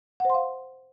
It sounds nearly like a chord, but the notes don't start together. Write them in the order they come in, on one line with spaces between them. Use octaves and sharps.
F#5 C5 C6 F5